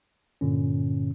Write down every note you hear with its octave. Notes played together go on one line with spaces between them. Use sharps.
G2 A#2 D3 C#4